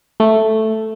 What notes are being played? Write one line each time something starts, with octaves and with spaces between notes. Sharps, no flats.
A3